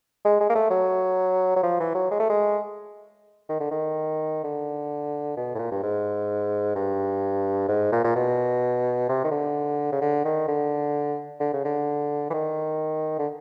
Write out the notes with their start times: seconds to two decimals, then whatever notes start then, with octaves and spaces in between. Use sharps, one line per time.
0.25 G#3
0.41 G#3
0.50 A#3
0.55 A3
0.70 F#3
1.56 F#3
1.63 F3
1.80 E3
1.95 F#3
2.11 G#3
2.20 A3
2.29 G#3
3.49 D#3
3.60 D3
3.71 D#3
4.44 D3
5.37 B2
5.55 A2
5.59 A#2
5.71 G2
5.83 G#2
6.75 G2
7.69 G#2
7.92 A#2
8.04 A#2
8.16 B2
9.09 C3
9.24 D#3
9.31 D3
9.92 C#3
10.01 D3
10.25 D#3
10.48 D3
11.40 D3
11.54 C#3
11.65 D3
12.30 E3
12.34 D#3
13.19 D3